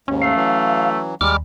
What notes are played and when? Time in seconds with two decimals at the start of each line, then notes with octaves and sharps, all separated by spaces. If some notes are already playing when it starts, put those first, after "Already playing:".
0.08 D#2 G#2 C#4
0.22 A3 F5
0.36 E3 F#3
1.21 D#2 G3 G#3 D6 F6